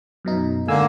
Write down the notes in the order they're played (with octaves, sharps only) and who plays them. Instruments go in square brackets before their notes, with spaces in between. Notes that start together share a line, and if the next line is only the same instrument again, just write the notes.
[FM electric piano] F#2 B2 D#4
[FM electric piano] G#2 G#5 E6 [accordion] D3 A#3